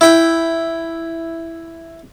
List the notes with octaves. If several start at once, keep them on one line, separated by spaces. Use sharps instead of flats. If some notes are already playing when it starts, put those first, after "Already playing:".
E4 G5